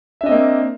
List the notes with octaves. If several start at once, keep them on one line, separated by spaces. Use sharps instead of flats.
A#3 C4 D4 D#5 E5